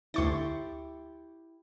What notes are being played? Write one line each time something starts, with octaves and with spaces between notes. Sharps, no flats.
D2 E4 G4 C6 C#6 A6